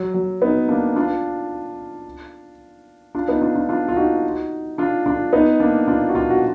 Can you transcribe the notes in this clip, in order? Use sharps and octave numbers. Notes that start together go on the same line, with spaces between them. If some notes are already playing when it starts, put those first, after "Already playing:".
Already playing: F#3
F#3
B3 D#4
A#3 D4
D4 F4
D4 F4
B3 D#4
D4 F4
D4 F4
D4 F4
F4
D#4 F#4
D4 F4
D4 F4
B3 D#4
A#3 D4
D4 F4
F#4
D4 F4
F#4